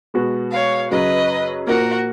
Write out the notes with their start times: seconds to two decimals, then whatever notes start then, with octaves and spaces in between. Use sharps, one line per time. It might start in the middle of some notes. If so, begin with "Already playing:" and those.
0.14 B2 G#3 B3 F#4
0.52 C#5 F5
0.91 F#2 C#3 F#3 B4 D#5
1.67 A#2 F3 A#3 F#4 A#4